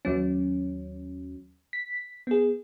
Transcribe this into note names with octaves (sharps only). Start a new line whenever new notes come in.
D#2 F#3 C#4
B6
B3 G#4